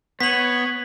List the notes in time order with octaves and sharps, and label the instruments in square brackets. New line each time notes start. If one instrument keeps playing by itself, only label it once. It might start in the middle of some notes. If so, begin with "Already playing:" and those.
[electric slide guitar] B3 [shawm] C#5 [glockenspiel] B6 F#7